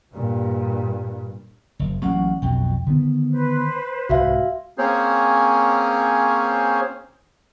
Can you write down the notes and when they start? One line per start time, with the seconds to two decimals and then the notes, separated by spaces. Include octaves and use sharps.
0.14 G2 A#2
1.79 F#1
2.02 A1 F#3 A#3 C#4 F#5
2.42 B1 F2 B2 G5
2.86 D3 D#3 B3
3.31 B4 C5
4.09 C2 G#2 F#4 E5 F5
4.78 A#3 C4 C#4 G#4 C5 C#5